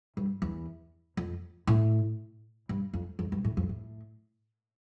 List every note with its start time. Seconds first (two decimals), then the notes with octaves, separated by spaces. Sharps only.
0.17 G2
0.42 E2
1.17 F2
1.67 A2
2.69 G2
2.94 F2
3.19 F2
3.32 G2
3.45 A2
3.57 F2
3.69 A2